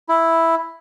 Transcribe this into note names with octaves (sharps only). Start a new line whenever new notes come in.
E4